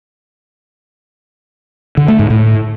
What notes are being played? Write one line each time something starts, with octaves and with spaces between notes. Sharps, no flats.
D3
A3
G#2
A2